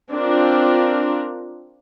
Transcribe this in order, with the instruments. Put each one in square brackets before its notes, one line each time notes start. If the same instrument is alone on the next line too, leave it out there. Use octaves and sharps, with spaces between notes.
[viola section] C4 D4 F4 A#4